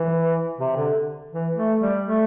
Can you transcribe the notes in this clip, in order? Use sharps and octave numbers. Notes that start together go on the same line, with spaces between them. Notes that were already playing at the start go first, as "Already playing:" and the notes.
Already playing: E3
C3
D3
E3
A3
G3
A3